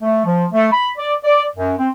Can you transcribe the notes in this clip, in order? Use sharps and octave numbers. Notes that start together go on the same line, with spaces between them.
A3
F3
A3
B5
D5
D5
F#2
C4